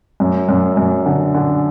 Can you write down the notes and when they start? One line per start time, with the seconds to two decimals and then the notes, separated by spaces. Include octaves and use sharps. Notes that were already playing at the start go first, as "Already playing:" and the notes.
0.20 F#2
0.49 F#2
0.77 F#2
1.06 D3
1.34 D3